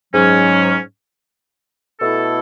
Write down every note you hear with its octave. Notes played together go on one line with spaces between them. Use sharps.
G#2 F#3 C#4
B2 A3 E4 A4